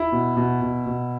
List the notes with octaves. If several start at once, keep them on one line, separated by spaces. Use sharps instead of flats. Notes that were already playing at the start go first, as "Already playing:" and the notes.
Already playing: E4
B2
B2
B2
B2